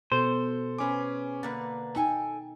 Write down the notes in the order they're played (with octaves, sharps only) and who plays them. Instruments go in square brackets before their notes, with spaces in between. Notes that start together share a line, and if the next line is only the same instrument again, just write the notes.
[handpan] B2 [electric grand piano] A4 [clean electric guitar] C5
[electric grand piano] C#4 D6 [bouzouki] G#4 B4
[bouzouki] D3 A#3 B4 [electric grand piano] A6
[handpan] D#4 [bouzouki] A4 G5 G#5